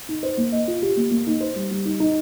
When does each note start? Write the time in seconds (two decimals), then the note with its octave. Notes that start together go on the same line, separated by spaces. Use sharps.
0.09 D#4
0.23 C5
0.37 A#3
0.52 D#5
0.67 F4
0.82 G4
0.97 A#3
1.11 A#3
1.27 D#4
1.40 C5
1.56 G3
1.71 G3
1.85 D#4
2.00 D#4